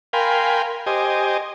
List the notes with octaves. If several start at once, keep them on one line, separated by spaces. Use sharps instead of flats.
A#4 F5 G5 G#5 B5 C6
G4 C5 D#5 G#5